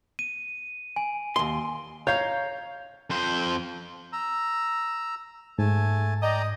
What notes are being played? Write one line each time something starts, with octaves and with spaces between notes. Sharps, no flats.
D#7
G#5
D#2 C6
C#5 F5 A#5 G6
F2 C5
A#5 E6
G#2 A3 G#5 A5
D5 D#5 G5 A#5